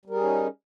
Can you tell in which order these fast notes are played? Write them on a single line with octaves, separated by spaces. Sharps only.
G3 A#4 G#4 C#4 D#4